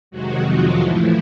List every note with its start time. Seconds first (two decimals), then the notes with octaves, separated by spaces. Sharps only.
0.11 F2 C3 D#3 F#3 G#3 F#4
0.46 F3 F4
0.80 A2 E3 F3 A3 E4